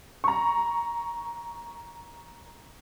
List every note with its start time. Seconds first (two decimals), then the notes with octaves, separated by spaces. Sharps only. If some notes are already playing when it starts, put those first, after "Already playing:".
0.24 A#5 C#6